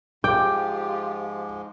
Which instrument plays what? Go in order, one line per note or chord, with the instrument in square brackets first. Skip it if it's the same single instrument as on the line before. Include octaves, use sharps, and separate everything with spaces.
[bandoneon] G#2 F3 G#3 [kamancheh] F4 G4 [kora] G5 [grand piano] D6